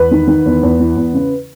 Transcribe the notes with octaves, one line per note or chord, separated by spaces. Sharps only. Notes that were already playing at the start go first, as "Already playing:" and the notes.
Already playing: E2 B3 B4
D#3
D#3
E2
E2
E3
E2
C#3